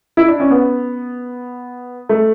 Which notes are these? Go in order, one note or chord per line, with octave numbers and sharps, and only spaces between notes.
E4
D4
C#4
B3
A3